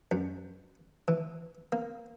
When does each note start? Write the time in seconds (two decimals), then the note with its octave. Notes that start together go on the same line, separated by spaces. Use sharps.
0.11 F#2
1.08 E3
1.72 A#3